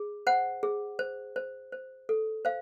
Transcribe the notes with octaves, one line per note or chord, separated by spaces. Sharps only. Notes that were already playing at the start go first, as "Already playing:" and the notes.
Already playing: G#4
C5 F#5
G#4
C5
C5
C5
A4
C5 F5